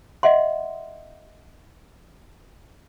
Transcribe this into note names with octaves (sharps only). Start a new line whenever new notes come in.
D#5 E5 F#5 C6